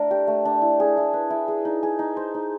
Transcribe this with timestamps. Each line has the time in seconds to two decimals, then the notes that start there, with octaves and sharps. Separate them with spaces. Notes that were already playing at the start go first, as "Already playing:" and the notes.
Already playing: A3 D4 A#4
0.11 G4
0.27 A3
0.45 D4
0.62 E4
0.80 G#4
0.97 E4
1.13 B4
1.30 E4
1.48 G#4
1.65 D#4
1.83 G#4
1.99 D#4
2.17 C5
2.34 D#4